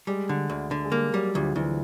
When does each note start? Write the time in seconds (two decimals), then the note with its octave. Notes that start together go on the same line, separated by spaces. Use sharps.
0.07 G3 G#3
0.29 D3
0.50 D2
0.71 D3
0.84 G#3
0.92 G3 A#3
1.14 F#3 G3
1.35 D2 F3
1.56 D2 E3